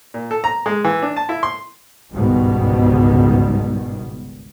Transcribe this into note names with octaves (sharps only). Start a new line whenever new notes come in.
A#2
A4
A#5
G#3
E3
D4
A5
E4
C6
G1 C#2 G#2 B2 D#3 G3